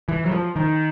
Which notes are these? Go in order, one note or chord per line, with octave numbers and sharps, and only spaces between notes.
E3
F#3
F3
D#3